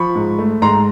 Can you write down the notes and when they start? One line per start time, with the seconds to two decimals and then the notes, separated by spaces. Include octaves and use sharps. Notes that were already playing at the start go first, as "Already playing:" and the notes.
Already playing: F3 B5 C#6
0.15 G#2
0.39 A3
0.62 G#2 A#5 C6